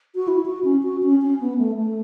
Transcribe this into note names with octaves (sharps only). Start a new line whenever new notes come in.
F#4
E4
F#4
C#4
F#4
C#4
C#4
B3
A3
A3